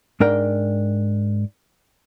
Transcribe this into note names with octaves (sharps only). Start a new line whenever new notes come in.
G#2 D4 A#4 G5